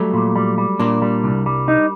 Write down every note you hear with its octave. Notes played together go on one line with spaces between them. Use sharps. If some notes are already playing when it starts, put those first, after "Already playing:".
Already playing: F#3 G3 A3
A#2
G3
G3
A#2 A#3 D4
G3
C2
G3
D#4